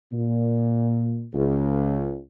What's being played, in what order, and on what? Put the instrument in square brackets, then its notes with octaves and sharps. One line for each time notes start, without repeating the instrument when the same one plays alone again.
[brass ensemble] A#2
C#2